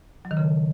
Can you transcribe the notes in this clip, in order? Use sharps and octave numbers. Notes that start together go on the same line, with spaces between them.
F#3
D#3
C#3